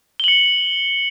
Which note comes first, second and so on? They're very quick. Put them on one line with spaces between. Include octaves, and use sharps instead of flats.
G7 F#7 C#7